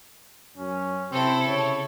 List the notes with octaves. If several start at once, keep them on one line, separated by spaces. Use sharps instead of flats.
F#2 C#4
C3 C4 E4 A4
C#3 C#5